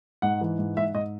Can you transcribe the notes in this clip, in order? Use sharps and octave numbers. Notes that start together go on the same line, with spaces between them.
G#2 F#5
E3
G#2
G#2 E5
G#2 D#5